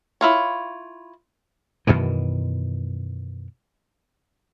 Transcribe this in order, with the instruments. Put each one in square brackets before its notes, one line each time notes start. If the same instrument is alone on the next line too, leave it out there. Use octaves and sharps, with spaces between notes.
[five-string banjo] E4 F4 C#5
[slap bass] F#2 B2 D#3 E3